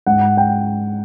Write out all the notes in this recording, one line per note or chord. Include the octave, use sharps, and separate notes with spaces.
G#2 F#5
G5